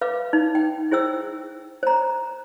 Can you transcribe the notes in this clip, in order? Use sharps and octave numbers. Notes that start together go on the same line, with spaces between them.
B4 F5 D6
D#4
G5
E4 G#4 C5 G5 E6
C5 A#5